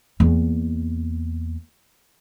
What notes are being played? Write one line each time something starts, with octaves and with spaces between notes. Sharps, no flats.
E2 A#3